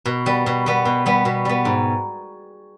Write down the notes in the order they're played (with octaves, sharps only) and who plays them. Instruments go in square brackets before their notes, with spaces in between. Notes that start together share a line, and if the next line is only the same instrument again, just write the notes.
[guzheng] B2
G3 B3
B2
G3 B3
B2
G3 B3
B2
G3 B3
G#2